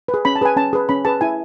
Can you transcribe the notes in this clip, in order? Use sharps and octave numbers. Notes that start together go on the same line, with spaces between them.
B4
G#4
C#4 B5
A5
G#4 B4 G#5
C#4 A5
G#4 B4
C#4 B5
G#4 B4 A5
E4 G#5